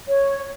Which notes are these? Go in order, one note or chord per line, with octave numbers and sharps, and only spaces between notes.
C#5